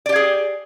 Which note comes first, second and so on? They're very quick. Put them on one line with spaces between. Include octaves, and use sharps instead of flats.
D5 G4 F5 G#4